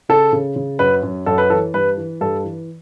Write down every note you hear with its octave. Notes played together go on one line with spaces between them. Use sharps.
C#3 A4
C#3
C#3
F#2 B4
F#2
F#2 A4
B4
E3 A4
G2 B4
E3
G2 A4
E3